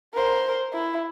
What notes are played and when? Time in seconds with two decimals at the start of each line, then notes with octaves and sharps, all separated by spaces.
0.14 A#4 C5
0.73 E4